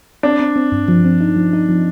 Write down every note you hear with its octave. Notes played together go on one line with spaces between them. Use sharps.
C4 D4
C4
C4
G2
F3
C4
D#4
F3
D#4
F3